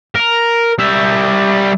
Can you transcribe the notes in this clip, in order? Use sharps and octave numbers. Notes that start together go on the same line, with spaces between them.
A#4
G3 E5